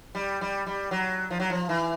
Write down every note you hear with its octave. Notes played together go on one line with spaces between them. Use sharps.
G3
G3
G3
F#3
F3
F#3
F3
E3